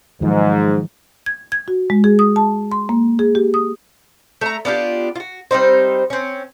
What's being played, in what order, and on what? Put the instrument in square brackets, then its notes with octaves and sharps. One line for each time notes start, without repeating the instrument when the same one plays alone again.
[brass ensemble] G#2 [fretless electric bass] D#3 F3 F#3
[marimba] G#6
G#6
F#4
G#3
G#4
D#6
A5
C6
A#3
G#4
G4
D#6
[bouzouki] A3 E5 A#5
B3 D4 F4 G4
F4 F#4
G3 C4 D#4 C5
C4 C#4